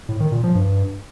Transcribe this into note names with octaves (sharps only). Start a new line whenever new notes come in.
A2
D#3
A#2
F3
G2